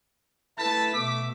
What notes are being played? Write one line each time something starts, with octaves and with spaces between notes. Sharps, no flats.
A3 E4 A4 B4 A5 B6
B2 E5 D6